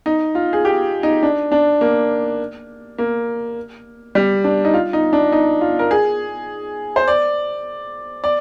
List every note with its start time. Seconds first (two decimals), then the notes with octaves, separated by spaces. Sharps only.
0.06 D#4
0.35 F4
0.53 G#4
0.65 G4
1.03 D#4
1.23 D4
1.52 D4
1.81 A#3
2.98 A#3
4.15 G3
4.44 D4
4.65 D#4
4.74 F4
4.93 D#4
5.13 D4
5.32 D#4
5.61 F4
5.79 A#4
5.91 G#4
6.96 C5
7.08 D5
8.24 D5